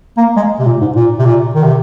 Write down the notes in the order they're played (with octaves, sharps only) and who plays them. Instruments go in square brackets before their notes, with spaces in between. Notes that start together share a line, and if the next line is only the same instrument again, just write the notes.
[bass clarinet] A#3
G#3
C3
A#2
G#2
A#2
C3
A#2
D#3
C3